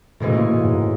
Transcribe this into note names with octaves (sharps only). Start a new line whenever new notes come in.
D2 A2 C#3 E3 G#3 C#4
A#2
A#2
A2
G#2